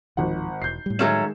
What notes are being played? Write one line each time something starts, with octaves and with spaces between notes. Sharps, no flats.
D1 G#1 D#3 F3 F#5
E1 G6 C7
A2 G3
D#3 F#3 G#3 A3 C#4 E7